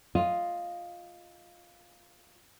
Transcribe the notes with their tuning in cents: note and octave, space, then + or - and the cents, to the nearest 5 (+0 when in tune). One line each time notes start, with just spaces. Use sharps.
F4 +0 D#5 +0